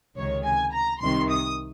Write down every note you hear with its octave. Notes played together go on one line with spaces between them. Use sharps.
C#2 C3 D#3 C#5
G#5
A#5
C2 C3 D#3 C6
D#6